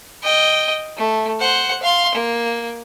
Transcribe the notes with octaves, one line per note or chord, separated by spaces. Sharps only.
D#5 G5
A3
C5 F#5
F5 C6
A#3